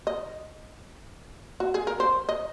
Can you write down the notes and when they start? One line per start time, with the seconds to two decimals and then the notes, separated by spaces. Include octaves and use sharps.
0.07 D#5
1.60 F#4
1.74 G#4
1.87 A#4
2.00 C5
2.29 D#5